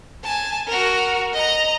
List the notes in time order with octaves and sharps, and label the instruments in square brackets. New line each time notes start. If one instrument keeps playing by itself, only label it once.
[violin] G#5 A5
F#4 A#4
D#5 A#5